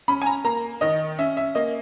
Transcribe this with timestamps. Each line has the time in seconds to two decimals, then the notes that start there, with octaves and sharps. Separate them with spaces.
0.08 C#4 B5
0.22 G#5
0.26 A#5
0.45 A#3 A#5
0.81 D#3 D#5
1.19 C#4 E5
1.37 E5
1.55 A#3 D#5